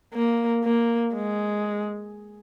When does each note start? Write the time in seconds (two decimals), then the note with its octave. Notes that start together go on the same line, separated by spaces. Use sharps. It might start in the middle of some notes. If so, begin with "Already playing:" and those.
0.14 A#3
0.64 A#3
1.14 G#3